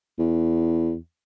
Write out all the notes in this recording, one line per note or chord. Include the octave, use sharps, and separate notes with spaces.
E2